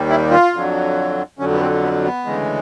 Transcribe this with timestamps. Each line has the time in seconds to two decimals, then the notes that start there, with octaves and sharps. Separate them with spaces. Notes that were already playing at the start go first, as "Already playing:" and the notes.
Already playing: D#2 D#3 G3
0.10 E4
0.31 F4
0.53 F2 D3 F#3
1.39 F2 D3 F#3 C#4
1.53 B3
1.61 C4
1.83 B3
2.04 B3
2.25 D2 C#3 E3 G#3